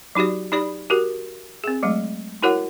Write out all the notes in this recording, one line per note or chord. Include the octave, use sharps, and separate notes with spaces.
F#3 D#4 F#4 G4 D5
D#4 G4 D5 B5
F#4 G4 A#4
C4 G#4
F#3 G#3 A3
E4 F#4 A#4 C#5 F#5